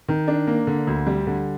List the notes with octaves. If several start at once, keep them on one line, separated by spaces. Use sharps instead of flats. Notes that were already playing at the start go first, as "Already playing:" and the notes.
D#3
D4
A#3
D3
D2
G3
D3